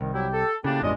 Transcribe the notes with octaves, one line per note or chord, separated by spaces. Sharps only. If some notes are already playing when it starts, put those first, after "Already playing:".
C2 D#3
F#3 E4 G4
A4
A2 C#3 A#3 D4 G4
A1 E2 G2 G#3 D4 F4 D#5